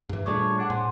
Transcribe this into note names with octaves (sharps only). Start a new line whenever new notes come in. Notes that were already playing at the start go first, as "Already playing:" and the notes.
G2 E3
A#2 G3 A3 D4 G#4 C#5 D6
D4 C#5 F#5
A2 C5 G#5